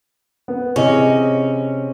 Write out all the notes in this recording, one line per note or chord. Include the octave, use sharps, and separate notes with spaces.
B3
C3 C#4 E4 G#4 D#5